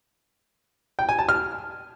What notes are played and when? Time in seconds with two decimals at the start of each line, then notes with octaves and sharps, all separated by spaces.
0.99 G5
1.09 G#5
1.19 A5
1.29 F6